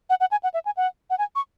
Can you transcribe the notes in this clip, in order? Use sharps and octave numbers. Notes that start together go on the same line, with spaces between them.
F#5
F#5
G#5
F#5
E5
G#5
F#5
F#5
G#5
C#6